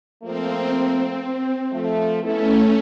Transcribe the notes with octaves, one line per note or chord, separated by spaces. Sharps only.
F3 A3 A#3 C4
F3 A3
A3 B3 C#4 E4 A4